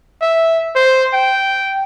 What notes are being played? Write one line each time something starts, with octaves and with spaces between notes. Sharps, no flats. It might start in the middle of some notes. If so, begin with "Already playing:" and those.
E5
C5
G5